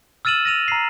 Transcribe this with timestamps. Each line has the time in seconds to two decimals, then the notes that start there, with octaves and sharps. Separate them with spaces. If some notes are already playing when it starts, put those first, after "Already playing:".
0.25 E6 F6 A6 D#7 E7 F#7
0.45 A#6 D#7 F7
0.68 A#5 C7